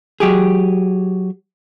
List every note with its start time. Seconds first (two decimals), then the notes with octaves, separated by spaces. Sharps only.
0.20 F#3 G4 G#4